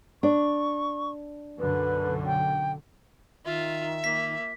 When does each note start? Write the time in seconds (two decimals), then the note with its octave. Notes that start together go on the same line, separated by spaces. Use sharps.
0.23 D4 C#6
1.59 B1 F#2 D3 B4
2.26 G5
3.45 D#3 F4 E5
4.04 A#3 B6